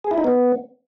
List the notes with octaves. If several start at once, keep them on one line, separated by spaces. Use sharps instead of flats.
G#4
E4
D#4
B3